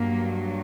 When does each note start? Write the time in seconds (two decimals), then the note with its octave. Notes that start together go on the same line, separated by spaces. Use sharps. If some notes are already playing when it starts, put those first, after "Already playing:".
Already playing: G2 F#3 A#3